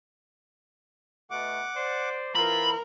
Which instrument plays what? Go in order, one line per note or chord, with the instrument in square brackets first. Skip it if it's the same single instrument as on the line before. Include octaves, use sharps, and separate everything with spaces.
[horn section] B2 A3 [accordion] F#5 D6
[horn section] C5 D5
[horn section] A#2 C4 F4 [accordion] E3 [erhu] A#4 [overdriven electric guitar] B5